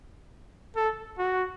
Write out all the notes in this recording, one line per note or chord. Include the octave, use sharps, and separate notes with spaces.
A4
F#4